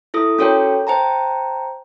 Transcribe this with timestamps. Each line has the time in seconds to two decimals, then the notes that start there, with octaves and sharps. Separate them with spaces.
0.14 E4 A4 D#6
0.39 C#4 F#4 A4 A#4 C#5 G5
0.87 C5 G5 A5 A#5